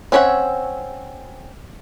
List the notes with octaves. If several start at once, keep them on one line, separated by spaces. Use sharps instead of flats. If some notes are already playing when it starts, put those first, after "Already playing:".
C4 C#4 C#5 E5 F#5